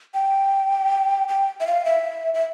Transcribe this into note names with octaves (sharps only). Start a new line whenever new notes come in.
G5
G5
E5
F5
E5
E5